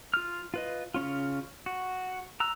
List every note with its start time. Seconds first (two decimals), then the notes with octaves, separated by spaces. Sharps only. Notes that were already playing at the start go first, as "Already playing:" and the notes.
0.14 F4 F6
0.54 F4 B4 D#5
0.94 C#3 B3 C#4 F4
1.66 F#4
2.40 A#5 E6 F#6